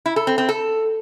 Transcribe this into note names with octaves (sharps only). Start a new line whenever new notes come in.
E4
A4
C4
C4
A4